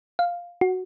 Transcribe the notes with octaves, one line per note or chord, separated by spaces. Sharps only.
F5
F#4